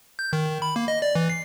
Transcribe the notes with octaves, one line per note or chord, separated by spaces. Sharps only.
G6
D#3
D#3
B5
A#3
D#5
D5
E3
C7